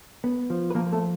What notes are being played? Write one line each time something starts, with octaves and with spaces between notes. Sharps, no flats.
B3
F3
B4
F3 A#3 A#4
A3 A4